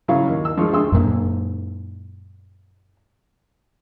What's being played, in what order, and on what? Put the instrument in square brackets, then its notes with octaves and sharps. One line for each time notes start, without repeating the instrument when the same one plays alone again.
[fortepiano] C#3 F#3 E4 F5 C#6
D#2
E6
D3 F3 G#3 C#6 F6
D2 D3 G#3 C6 D#6 E6
[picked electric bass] F#2 A#2